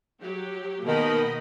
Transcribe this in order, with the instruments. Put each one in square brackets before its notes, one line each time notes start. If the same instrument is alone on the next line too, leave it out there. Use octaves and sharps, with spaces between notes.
[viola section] F#3 G4
[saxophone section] B2 D#3 [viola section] A#3 D#5 B5